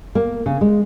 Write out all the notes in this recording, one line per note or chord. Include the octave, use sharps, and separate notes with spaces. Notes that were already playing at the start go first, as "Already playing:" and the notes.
A#3
C#3
G#3